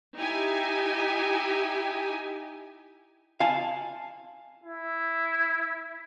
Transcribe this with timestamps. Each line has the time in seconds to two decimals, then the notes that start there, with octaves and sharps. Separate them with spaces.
0.16 D#4 E4 G4 G#5
3.40 F5 G#5 A5
4.64 E4